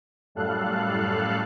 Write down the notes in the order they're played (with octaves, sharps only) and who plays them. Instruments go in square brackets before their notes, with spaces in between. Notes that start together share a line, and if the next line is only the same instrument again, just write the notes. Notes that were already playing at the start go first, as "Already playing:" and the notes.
[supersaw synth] F#2 A2 G3 A4 F5 F#6